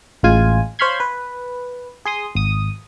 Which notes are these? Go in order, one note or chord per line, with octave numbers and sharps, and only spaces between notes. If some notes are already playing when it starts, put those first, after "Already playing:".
A1 G#3 F4 G#5
C5 C#5 F5 B5 C6 G#6
B4
G#4 C6 D#6
G#1 D#6